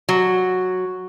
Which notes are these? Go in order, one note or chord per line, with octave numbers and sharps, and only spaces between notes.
F#3